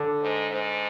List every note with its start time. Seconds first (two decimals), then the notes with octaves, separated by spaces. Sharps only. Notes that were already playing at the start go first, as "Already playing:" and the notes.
Already playing: D3
0.22 G#2
0.50 G#2